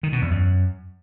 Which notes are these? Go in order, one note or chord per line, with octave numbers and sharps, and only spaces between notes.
D#3
B2
E2
F#2